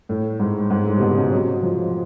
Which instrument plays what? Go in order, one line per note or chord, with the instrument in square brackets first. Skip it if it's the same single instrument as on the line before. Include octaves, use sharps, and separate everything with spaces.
[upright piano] A2
G#2
G#2
A2
C3
B2
C3
C#3
F#3
F3